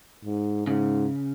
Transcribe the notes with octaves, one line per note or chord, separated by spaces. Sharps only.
G#2
G#2 C#3